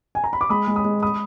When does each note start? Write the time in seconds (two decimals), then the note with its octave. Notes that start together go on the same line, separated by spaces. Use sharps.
0.15 G#5
0.24 A#5
0.33 B5
0.41 D6
0.49 G#3 B5 D#6
0.67 G#3
0.76 B5 D#6
0.84 G#3
1.03 B5 D#6